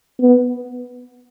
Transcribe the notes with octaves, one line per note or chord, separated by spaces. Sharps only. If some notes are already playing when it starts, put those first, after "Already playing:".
B3